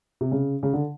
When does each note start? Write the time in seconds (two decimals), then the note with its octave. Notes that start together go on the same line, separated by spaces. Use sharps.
0.21 C3
0.32 C#3
0.63 C#3
0.73 D3